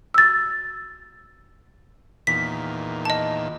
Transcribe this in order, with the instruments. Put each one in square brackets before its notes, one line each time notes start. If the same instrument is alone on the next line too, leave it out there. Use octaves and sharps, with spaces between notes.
[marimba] E6 A6
[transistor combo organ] E2 A#2 D#3 [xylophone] B6
[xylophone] D#5 A5